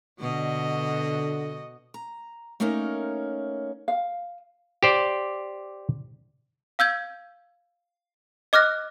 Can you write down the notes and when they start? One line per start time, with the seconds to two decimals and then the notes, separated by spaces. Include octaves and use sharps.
0.20 B2 D3 F#4 D#5
1.94 A#5
2.60 A3 A#3 C#4 D#4 A#4
3.88 F5
4.83 G4 C5 D5
6.79 F5 E6 G6 G#6
8.53 D#5 D6 F6 F#6 A#6